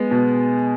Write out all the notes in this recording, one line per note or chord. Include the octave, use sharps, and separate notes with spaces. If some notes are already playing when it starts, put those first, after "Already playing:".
Already playing: G#3 B3
B2